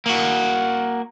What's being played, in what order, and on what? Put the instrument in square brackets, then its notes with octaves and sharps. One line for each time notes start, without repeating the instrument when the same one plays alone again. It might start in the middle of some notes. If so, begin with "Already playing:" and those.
[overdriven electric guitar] A#3 F#4